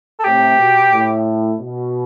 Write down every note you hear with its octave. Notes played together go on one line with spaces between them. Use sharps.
A4
A2 C3 G4
B2
A2
B2